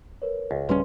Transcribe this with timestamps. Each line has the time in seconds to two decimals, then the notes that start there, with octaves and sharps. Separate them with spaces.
0.22 A#4 B4 C#5
0.51 C#2
0.69 D1 G3 C#4 B4 C6